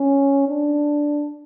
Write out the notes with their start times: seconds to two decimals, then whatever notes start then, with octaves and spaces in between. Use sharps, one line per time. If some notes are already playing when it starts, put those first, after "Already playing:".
Already playing: C#4
0.48 D4